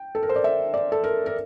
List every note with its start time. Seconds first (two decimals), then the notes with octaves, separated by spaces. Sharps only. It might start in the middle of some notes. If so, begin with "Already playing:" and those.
Already playing: G5
0.15 A4
0.23 A#4
0.29 C5
0.36 D5
0.44 E5
0.74 D5
0.92 A4
1.04 A#4
1.26 A#4